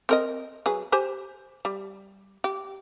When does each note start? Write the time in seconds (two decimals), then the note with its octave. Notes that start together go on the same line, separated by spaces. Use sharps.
0.09 C4 A#4 D#5
0.66 F#3 G#4 B4
0.92 G4 C5 G#5
1.65 G3
2.44 G4